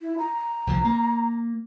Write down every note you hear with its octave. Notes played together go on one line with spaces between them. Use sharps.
E4
A#5
C2 D3 F3
A#3